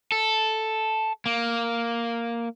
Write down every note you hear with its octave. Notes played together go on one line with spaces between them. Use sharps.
A4
A#3